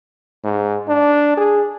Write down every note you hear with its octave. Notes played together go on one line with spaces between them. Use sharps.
G#2
D4
G#4